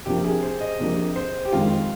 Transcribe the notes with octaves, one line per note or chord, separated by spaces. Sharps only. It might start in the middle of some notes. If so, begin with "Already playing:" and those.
C3 F3 A#3 D4 G4
G#4
C5
D#5
C3 F3 A#3 D4
C5
G4
F2 D#3 G#3 F4